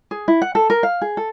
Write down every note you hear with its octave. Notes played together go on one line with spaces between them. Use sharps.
G#4
E4
F#5
A4
A#4
F5
G#4
A4